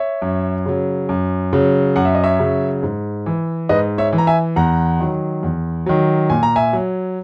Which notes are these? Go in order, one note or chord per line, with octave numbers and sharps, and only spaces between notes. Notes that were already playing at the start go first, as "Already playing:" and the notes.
Already playing: C#5 E5
F#2
C#3 F#3
F#2
C#3 F#3
F#2 F#5
E5
D#5
C#5 E5
C#3 F#3
G#2
E3
G#2 B4 D#5
C#5 E5
E3
A#5
E5 G#5
E2 F#5 A#5
D#3 F#3
E2
D#3 F#3
A#2 G#5
A#5
E5 G#5
F#3